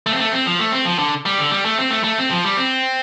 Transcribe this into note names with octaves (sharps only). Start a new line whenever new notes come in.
A3
C4
A3
C4
F3
A3
C4
F3
D3
G3
D3
G3
A3
C4
A3
A3
C4
F3
G3
C4